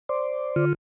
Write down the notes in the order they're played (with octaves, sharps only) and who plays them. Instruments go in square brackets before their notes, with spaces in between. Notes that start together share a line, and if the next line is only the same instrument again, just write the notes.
[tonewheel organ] C5 D5
[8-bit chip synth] D3 F4 F6